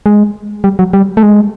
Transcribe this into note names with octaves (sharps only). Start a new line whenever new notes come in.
G#3
G3
F#3
G3
A3
G#3